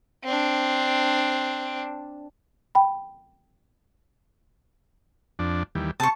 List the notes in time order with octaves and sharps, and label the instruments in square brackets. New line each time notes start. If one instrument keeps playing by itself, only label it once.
[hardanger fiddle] C4 D4
[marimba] G5 B5
[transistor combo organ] F2 D4
D#2 E3 G3
[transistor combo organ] C3 [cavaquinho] A5 C#6